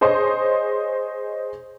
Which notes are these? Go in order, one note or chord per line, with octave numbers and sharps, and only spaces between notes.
G#4 C5 C#5 D#5 C6